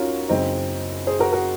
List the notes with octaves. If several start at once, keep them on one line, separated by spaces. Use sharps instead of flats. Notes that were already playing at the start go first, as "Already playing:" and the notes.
Already playing: D#2 C#4 F4 F#4 A#4
F#1 F#2 C#3 C4 D#4
G#4 C5
F#4 A#4
F#4 A#4